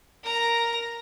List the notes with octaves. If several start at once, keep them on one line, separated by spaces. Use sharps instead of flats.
A#4 A#5